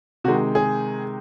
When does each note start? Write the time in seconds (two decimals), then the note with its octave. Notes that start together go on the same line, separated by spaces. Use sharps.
0.24 C3 D#3 G#3 F#4
0.55 G#4